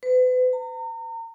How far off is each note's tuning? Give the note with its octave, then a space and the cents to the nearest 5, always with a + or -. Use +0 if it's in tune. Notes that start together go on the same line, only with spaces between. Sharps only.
B4 +40
A#5 -35